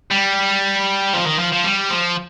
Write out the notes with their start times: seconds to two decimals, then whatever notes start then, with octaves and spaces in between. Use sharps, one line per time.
0.11 G3
1.13 F3
1.26 D#3
1.39 F3
1.52 F3
1.64 G3
1.90 F3